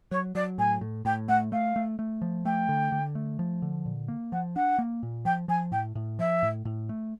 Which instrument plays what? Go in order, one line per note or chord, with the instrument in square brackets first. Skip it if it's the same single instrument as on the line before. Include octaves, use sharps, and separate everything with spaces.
[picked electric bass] F#3 [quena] C#5
[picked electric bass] F#3 [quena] D5
[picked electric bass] A2 [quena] G#5
[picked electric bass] A2
[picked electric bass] A2 [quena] G5
[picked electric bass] A3 [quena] F#5
[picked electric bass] A3 [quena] F5
[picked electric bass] A3
A3
F3
[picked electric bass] A3 [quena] G5
[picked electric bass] D3
D3
A3
F3
D3
A#2
A#3
[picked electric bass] F3 [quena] F#5
[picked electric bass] D4 [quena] F#5
[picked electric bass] A#3
A#2
[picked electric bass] F3 [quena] G5
[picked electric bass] F3 [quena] G#5
[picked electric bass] A2 [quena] G5
[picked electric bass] A2
[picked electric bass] F3 [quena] E5
[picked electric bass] A2
A2
A3